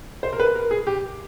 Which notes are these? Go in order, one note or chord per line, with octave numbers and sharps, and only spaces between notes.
C5
A#4
B4
A#4
G#4
G4